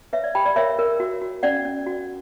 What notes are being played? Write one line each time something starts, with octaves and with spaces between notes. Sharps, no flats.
B4 C#5 E5
D5
G4 G5 B5
D5
A#4 C#5 E5
A#4
F#4
F#4
C#4 D5 F#5
C#4
F#4